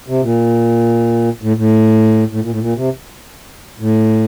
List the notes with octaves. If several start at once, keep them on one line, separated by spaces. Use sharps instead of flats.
C3
A#2
A2
A2
A2
A#2
A2
A#2
C3
A2